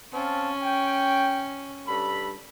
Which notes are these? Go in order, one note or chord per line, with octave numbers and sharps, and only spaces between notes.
C4 C#4 F5 A5
G5
G2 A4 B5